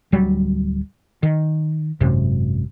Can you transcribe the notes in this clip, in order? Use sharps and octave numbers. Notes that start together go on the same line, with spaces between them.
D1 F#3 G3
D#3
G#1 F#2 C3